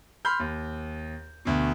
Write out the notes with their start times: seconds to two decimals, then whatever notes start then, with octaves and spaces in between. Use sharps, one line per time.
0.25 B5 C6 F6 G6
0.39 D#2
1.45 D2 B2